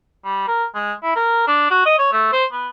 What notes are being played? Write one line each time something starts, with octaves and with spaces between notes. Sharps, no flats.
G3
A#4
G#3
E4
A#4
D4
F#4
D#5
C#5
A3
C5
B3